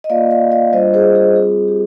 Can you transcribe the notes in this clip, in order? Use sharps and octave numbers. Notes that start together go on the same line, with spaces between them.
D#5
A#3 F4 D5 F5
D5 F5
D5 F5
G3 D4 F4 C5 D#5
G#4 C5
G#4
G3 C4 F4 G#4
G4